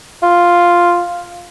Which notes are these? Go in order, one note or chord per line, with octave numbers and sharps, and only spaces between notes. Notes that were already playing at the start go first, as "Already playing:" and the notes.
F4